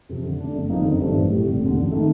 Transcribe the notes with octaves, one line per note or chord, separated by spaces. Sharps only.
F2 C3
D3
A3 D4
G1
F2 D#3 A#3 D#4
G1
G2 D#3 A3 C4
A1
A2 G3
F1
D#2 D3
A1
D#3 A3